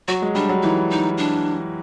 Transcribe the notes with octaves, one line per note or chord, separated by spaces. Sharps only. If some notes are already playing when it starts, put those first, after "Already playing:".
F#3 F#4
G#3
G3 D4
F#3
E3 D#4
D#4
D4